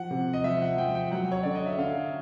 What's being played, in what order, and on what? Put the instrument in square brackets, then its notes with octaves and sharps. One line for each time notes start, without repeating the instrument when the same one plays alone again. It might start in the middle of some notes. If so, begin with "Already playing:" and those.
Already playing: [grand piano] F3 [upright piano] F#5
[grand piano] C3
[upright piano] D#5
[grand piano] F3 [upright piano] E5
[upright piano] F#5
[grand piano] F3 [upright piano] G5
[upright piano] G5
[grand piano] F#3 [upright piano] F#5
[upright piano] C#5
[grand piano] D3 [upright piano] D5
[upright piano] D#5
E5
[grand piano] D3 [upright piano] F5